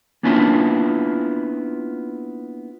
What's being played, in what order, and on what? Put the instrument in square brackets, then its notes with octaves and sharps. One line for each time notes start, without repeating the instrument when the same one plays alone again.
[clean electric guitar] A#3 B3 C#4 D4 E4 F4